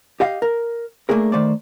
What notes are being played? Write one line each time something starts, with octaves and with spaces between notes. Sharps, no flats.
G4 D#5 F5
A#4
A3 A#3 D4 G#4 A#4
D#3 A3 C5 D5